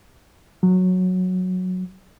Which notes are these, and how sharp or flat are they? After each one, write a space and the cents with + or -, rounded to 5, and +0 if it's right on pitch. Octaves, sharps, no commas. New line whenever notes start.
F#3 -10